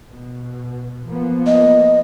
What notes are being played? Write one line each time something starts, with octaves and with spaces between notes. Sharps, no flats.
B2
F3 A#3 B3
D#5